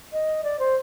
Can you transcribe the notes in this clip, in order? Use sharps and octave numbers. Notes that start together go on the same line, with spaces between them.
D#5
D5
C5